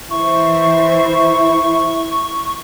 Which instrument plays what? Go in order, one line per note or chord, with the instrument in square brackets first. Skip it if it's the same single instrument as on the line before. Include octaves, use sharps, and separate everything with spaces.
[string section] E3 C5 [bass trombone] E4 [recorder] C#6